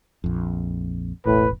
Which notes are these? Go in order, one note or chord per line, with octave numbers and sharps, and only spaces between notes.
A#1 F2
E1 A1 A2 B4